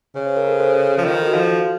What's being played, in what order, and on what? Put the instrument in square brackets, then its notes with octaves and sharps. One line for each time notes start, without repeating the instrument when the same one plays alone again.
[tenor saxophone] C#3 [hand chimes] C#5
[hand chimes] C5
A#4
A4 C5
A4 C5
[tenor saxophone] F3
[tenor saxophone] D#3 [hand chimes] F4
[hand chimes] A4
F#4
[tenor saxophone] F3